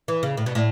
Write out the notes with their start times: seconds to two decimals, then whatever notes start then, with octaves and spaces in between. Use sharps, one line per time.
0.08 E3
0.23 C#3
0.37 A2
0.46 B2
0.55 A2